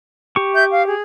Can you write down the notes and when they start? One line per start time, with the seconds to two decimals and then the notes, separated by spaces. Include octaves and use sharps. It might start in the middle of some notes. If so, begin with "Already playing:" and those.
0.36 G4 C#6
0.54 E5 G6
0.70 F5
0.87 G#4